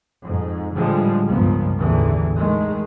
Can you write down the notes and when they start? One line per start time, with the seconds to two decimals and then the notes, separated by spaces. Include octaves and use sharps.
0.24 F2 G#2
0.75 A2 D3 F3 G3 G#3
1.28 C#2 G2 F3 A#3 B3
1.79 A1 E2 D3 E3
2.38 D#3 G#3 A3